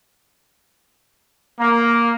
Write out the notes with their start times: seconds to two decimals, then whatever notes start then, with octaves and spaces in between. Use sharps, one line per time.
1.58 A#3